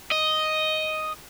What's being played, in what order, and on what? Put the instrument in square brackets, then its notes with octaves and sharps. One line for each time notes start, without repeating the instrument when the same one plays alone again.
[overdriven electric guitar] D#5